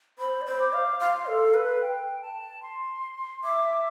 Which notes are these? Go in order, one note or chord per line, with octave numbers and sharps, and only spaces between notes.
C5 B5
D5
C5
D6
F5
F5 C6
C6
A4
F5
B4
F5
G5
A5
C6
E5 D6